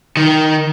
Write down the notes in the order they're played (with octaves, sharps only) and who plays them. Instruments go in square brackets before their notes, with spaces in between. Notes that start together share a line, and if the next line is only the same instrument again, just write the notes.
[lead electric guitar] D#3